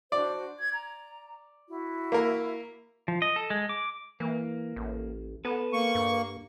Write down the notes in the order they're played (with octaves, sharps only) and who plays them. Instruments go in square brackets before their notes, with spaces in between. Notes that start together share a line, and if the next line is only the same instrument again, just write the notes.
[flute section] D4 F#4 C5 [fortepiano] D5
[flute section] G#6
A#5
E4 F#4
[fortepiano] A#3 A#4
[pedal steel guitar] F3
D#5
A4
G#3
D6
[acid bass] E3 [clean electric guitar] A#3
[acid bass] A1
[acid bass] B3 [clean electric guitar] A4 B4
[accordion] A#3 C#6
[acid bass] G2